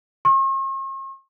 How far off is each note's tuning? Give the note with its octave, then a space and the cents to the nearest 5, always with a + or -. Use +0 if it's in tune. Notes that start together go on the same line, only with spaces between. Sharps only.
C#6 -45